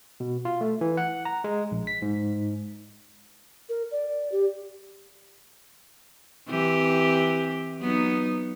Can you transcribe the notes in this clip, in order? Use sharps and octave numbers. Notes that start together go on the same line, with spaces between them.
B2
F4
A3
E3
F#5
A#5
G#3
A#1
B6
G#2
A#4
D5
G4
E3 C4 G4
F#3 B3 D#4